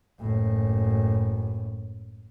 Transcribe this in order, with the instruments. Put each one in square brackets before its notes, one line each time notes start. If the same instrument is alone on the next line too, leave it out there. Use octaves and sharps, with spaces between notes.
[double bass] F#1 A2